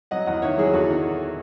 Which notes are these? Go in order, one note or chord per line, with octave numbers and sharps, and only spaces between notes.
F#3 D#5 F#5
E2 D#5 F#5
D#3 C#5 E5
F#3 E4 G#4
E2 F#4 A4
D#3